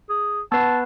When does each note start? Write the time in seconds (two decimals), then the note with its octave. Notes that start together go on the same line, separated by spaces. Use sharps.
0.09 G#4
0.52 B3 B4 A5